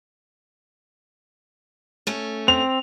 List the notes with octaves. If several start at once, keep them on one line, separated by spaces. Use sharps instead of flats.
A3 C#4
C4 F7